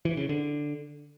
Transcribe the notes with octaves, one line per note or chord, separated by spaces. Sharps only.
E3
C#3
D3